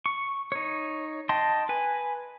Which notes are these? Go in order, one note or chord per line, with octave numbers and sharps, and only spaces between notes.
C#6
D#4 C#5
D#5 G5 A5 C6
B4 G#5